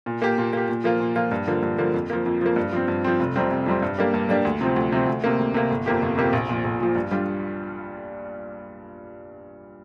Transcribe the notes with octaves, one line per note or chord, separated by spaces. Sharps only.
A#2
A#3 G4
A#2
A#3 G4
A#2
F3 A#3 F4
A#2
F3 A#3 F4
G2
D3 F3 A#3
G2
D3 F3 A#3
F2
F3 A#3
F2
F3 A#3
G2
F3 C4
G2
F3 C4
F1
F2 C3 G3 C4
F1
F2 C3 G3 C4
G2
G3 A#3 D4 G4
G2
G3 A#3 D4 G4
D2
C3 F3 C4
D2
C3 F3 C4
D2
C3 A#3
D2
C3 A#3
G1
F2 C3 A#3 G4
G1
F2 C3 A#3 G4
A#1
A#2 F3
A#1
A#2 F3
G2
G3 D4 F4